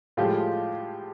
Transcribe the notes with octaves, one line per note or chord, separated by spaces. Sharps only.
A2 F3 G#3 F4 G4